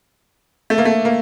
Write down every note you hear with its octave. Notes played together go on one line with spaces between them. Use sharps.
A3
A#3
A3
A#3